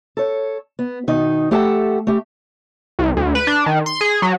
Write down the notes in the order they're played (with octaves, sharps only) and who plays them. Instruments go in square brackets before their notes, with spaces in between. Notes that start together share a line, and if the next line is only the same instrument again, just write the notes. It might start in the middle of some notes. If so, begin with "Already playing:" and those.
[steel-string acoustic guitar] A4 C#5
B3
B2 D#3 D#4
A3 G4 A4 F#5 G5 A5
A3 G4
[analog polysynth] C2
D2
B4
D4
D#3
C6
G#4
F#3